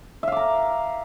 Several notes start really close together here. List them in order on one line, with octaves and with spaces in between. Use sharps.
E5 F5 D6 A#5